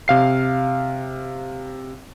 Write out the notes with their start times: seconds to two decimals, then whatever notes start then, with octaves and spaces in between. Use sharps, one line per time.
0.08 C3 F5 C7